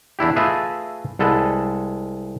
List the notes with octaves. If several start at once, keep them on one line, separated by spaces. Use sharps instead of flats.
E2 D4 E4 G4
A3 F4 G#4 B4 D#5 E5
C2 G#3 A4 B4